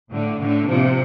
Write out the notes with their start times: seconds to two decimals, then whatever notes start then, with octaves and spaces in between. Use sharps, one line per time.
0.11 A2 D3
0.40 A2 D3
0.69 C3 F3